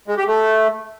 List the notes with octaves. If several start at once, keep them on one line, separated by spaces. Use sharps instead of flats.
G#3
G4
A3